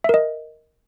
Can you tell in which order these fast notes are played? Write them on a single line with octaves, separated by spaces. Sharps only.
E5 A#4 D#5